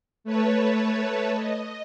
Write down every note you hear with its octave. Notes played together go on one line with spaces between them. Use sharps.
A3 B4 C#5 A5
D#5